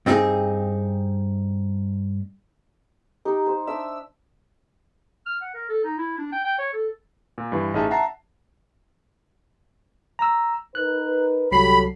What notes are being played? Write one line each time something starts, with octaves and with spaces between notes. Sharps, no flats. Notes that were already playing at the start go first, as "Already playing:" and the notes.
G2 C4 D#4 F4 G#4
D#4 G4
C5
D4 E5 D6 E6
F6
F#5
A#4
A4
D#4
E4
D4
G5
G5
C#5
A4
A#2
G2 E3
A1 D#4 G#4 D#5 E5 A5
E5 F#5 A5 A#5 C7
A#5 E6
D#4 A#4 B4 F#6
C2 D3 F#3 G4 B5 C7